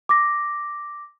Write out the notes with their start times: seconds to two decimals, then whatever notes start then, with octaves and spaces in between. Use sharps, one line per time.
0.09 D6 A#6